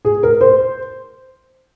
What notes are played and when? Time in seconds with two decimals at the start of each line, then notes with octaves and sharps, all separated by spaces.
0.05 G#4
0.23 A#4
0.41 C5